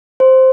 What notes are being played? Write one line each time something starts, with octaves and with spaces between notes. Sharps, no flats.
C5